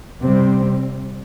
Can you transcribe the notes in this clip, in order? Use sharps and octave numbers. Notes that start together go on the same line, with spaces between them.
C3 G3 C4